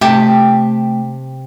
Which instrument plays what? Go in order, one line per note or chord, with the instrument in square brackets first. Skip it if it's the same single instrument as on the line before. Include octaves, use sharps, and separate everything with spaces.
[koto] C3 G4 A5 [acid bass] A3